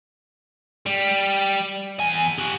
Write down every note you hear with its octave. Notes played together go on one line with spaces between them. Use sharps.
G3
E2 G#5
G4 F#5